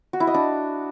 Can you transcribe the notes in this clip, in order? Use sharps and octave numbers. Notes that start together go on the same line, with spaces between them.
F#4
E4
D#5
D4